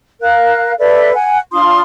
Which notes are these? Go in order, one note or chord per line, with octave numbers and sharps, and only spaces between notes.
A#4 F5 F#6
A4 B4 D5 E5
F#5 G#5
D4 F4 C6 D#6